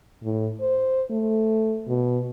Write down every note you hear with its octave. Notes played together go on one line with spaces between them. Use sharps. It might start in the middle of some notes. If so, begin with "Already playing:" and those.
A2
C5
A3
B2